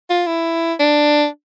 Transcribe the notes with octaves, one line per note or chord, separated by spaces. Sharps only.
F4
E4
D4